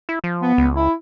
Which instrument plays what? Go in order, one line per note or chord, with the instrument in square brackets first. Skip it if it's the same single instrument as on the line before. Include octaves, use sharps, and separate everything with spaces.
[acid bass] E4
F3
[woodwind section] B3
[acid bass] C#2
[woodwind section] E4